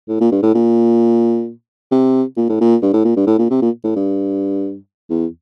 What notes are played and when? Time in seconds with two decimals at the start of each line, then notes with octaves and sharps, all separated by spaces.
0.08 A2
0.21 A#2
0.31 G2
0.43 A2
0.55 A#2
1.91 C3
2.36 A#2
2.49 A2
2.61 A#2
2.82 G2
2.93 A2
3.04 A#2
3.17 G2
3.27 A2
3.38 A#2
3.50 C3
3.62 A#2
3.84 A2
3.96 G2
5.10 E2